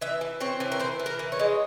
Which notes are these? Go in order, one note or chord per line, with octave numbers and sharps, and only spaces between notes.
E3 E5
E3
C4 C#5
E3
A#4
E3 C5
E3
A#4
E3
C#5
G#3